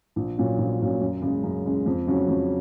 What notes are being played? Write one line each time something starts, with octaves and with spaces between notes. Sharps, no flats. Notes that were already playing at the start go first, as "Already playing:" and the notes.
A#1
A#2 F#3 C#4
A#1
A#2 F#3 C#4
F#2
C#3 G#3
F#2
C#3 G#3
F2
C#3 F#3 C#4 F#4
F2